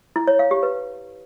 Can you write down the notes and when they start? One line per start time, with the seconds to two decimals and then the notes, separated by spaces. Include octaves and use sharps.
0.16 E4
0.27 C#5
0.39 F5
0.51 G4
0.63 B4